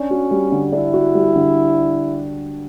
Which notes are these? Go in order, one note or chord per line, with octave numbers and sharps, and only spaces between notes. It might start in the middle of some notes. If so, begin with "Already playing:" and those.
Already playing: C#4 D4
F#4
G3
D3
D4 E4
F#4
G3
D3